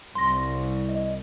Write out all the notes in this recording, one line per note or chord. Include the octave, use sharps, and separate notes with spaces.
C2 C6 A#6
D#5